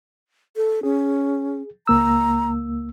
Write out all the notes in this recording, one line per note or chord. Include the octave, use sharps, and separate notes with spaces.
A4
C#4 G#4
C#2 A#3 A#5 E6